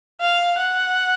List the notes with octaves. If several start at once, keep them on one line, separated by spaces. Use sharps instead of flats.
F5
F#5